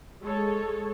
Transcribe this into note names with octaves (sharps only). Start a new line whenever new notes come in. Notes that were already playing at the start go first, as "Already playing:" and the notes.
G#3 A4 C#5